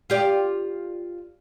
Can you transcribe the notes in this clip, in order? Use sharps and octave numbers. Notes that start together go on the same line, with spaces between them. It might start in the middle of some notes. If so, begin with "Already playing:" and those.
F4 G4 D5